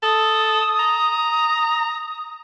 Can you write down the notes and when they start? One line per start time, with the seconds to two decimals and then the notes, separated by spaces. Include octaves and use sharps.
0.03 A4 D#6
0.79 A#5